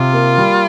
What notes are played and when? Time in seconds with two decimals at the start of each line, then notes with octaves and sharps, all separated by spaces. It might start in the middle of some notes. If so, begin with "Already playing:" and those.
Already playing: C3 F4
0.13 A#3
0.38 G3